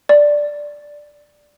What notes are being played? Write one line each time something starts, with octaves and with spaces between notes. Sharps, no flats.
D5